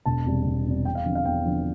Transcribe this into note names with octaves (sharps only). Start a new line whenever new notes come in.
E1 A5
E2 C3 G3
E1
E2 C3 G3
E2 G5
F5
D3 F3 C4
F5
E2 G5
D3 F3 C4